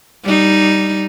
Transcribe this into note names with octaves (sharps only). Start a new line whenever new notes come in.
G3 D#4